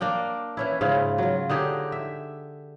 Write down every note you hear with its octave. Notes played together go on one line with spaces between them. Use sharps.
A#3 D4 A#4 G5
E3 C#4 E4
G#2 C#3 E4 F4
F#3 F4
D3 D#4 G4 G#4
E5